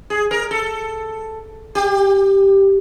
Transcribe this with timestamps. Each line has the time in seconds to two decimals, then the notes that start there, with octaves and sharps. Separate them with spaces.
0.10 G#4
0.31 A#4
0.51 A4
1.75 G4